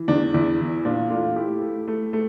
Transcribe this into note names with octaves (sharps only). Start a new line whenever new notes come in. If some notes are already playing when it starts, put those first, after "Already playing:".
Already playing: E3
E2 D4
E2 E4
E3
A#2 D4 F4
A3 F4 A4
A3 E4 G4
A3
A3
A3